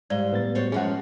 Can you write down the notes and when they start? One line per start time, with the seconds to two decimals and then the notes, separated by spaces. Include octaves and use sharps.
0.10 G#2 G3 D5 F5 G7
0.32 A2 B3 B4 A6
0.55 F#4 C5 C#5
0.72 F#2 F3 G#3 C#4 G#4 F#5